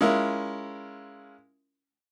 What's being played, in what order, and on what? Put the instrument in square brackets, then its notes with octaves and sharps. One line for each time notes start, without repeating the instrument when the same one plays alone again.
[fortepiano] G#3 C#4 E4 F4 A#4